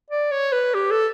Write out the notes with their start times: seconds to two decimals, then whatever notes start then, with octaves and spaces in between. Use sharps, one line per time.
0.10 D5
0.31 C#5
0.52 B4
0.74 G4
0.91 A4